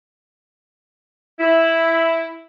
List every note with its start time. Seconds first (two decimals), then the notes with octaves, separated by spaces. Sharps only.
1.39 E4